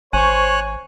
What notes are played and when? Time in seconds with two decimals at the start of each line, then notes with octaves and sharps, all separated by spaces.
0.13 G#1 C5 C#5 G#5 C#6 F#6